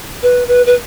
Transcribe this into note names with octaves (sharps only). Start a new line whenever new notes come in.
B4
B4
B4